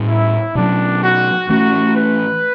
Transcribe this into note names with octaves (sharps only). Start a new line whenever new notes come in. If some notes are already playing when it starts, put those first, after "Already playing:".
Already playing: A2 G3 C#4
E4
B2 F#3 C#4 D4
F#4
E3 A3 C#4 F#4
B4